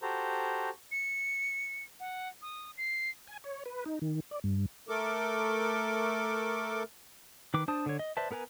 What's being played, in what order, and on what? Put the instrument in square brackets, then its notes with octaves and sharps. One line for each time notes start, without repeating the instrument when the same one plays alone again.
[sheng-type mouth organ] F#4 G4 A4 C5 A#5
[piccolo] C#7
F#5
D#6
C7
[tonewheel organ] G#5
C#5
B4
D#4
D#3
D5
G2
[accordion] A3 A4 A#4 D6
[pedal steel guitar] D#3 B4 D6
D4 C5 A5 D#6
D3 C#5
D#5
B4 C5 D5 E5 A5
B3 A#4 B4 G#5 A#5